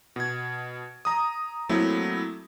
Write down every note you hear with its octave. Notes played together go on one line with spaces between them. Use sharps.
B2 G#6
A#5 D#6
F#3 A3 A#3 C4 E4 A4